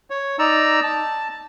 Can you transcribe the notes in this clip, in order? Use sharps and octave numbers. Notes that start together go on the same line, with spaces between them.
C#5
D#4 D5 A#5 E6
A5